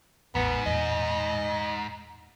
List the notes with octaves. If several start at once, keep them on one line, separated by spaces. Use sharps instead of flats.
A1 E2 G#2 B3
E2 A#2 D#5